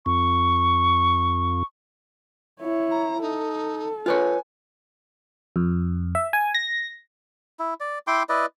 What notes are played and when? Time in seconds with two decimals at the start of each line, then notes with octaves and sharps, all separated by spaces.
0.06 F2 C#6
2.61 E4 C#5
2.91 A#5
3.21 D#4 A4
4.06 F4 B4 C#5 G#5
5.56 F2
6.15 E5
6.33 G#5
6.54 A#6
7.59 E4
7.80 D5
8.07 E4 G5 C6 D6
8.29 E4 B4 D5 D#5